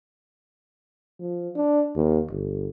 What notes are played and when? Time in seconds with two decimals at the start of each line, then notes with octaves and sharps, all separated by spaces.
1.20 F3
1.55 D4
1.95 D#2
2.31 G1